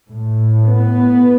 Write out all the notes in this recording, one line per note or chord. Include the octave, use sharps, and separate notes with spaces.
A2
B3